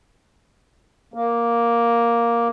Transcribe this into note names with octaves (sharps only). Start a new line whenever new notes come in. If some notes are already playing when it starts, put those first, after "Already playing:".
A#3